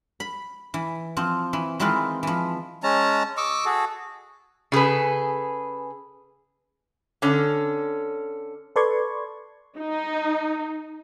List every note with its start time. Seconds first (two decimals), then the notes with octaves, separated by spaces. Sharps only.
0.20 B5
0.74 E3
1.17 F3 C4
1.53 E3
1.80 D#3 E3 G#3 C4 F4 B4
2.23 E3 F3
2.83 G#3 C#4 A5 A#5
3.37 D#5 C#6 D6 E6
3.65 F#4 G#4 A4
4.72 C#3 G#4 A4 B4
7.22 D3 C#4
8.76 A4 B4 D5 C6 C#6 G#6
9.77 D#4